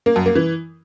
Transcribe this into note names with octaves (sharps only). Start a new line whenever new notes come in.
A#3
F#2
A#3
E3